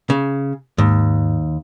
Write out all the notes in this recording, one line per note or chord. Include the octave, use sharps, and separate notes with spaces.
C#3
D#2 G#2